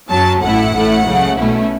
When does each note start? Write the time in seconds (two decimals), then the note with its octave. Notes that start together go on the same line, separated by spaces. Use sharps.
0.10 F#2 F#3 C#4 A5
0.42 A1 A2 A3 E4 F#5
0.74 A1 A2 A3 E4
1.06 C#2 C#3 F#3 A3
1.39 B1 B2 A3 C#4 E4